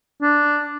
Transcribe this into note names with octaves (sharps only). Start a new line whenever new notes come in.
D4